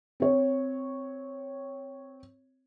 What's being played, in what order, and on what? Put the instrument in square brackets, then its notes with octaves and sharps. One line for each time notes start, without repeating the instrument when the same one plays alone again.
[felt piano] C4 C#5